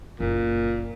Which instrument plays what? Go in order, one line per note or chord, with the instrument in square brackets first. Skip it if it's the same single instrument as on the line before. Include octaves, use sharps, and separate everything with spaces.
[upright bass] F#1 [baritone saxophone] A#2